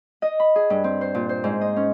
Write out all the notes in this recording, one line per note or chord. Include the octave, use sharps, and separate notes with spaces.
D#5
B5
G#4
G2
C4
C5
A#2
C5
G#2
D#5
C#4